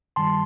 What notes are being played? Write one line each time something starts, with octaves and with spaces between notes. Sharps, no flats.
G2 D#3 G3 A5 C6